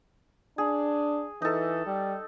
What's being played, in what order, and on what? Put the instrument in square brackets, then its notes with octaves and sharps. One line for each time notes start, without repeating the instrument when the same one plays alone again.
[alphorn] D4 [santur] G#4
[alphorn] E3 [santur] D#4 A4
[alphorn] G3